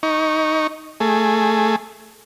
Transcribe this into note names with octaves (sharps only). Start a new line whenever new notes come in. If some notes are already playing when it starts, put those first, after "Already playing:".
D#4 C#6
A3 G#4